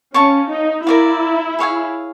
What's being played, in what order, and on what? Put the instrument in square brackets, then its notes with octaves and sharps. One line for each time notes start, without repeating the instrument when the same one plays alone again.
[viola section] C#4 [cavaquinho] C#5 F5 A5 C#6
[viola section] D#4
[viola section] E4 [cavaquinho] A#4 D5 F5
[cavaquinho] G#4 C#5 F5 G#5